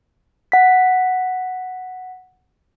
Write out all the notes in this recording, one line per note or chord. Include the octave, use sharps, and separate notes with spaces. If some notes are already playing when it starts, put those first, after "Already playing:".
F#5 B6